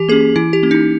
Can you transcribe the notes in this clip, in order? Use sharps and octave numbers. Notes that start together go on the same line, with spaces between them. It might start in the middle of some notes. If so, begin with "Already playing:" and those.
Already playing: E3 G4
A#3 C#4 G#4
E3 E4
G4
A#3 C#4
D#4